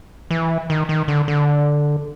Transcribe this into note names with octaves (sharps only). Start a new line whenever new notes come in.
E3
D#3
D#3
D3
D3